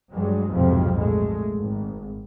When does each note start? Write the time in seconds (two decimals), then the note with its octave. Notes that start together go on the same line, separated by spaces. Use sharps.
0.13 G2 F#3 G#3
0.53 B1 F2 G#2 C3 F3 C4
0.97 A#2 G#3 A3
1.56 G#1